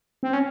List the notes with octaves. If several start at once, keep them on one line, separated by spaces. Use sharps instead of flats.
C4
C#4